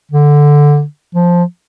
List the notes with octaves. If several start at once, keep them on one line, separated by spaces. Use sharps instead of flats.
D3
F3